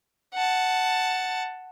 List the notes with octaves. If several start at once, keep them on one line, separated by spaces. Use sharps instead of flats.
F#5 A5